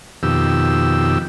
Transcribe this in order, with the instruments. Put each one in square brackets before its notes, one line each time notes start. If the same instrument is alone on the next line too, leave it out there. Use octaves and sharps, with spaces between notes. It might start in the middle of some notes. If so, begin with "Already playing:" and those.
[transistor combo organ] F2 B2 D#3 G4 E6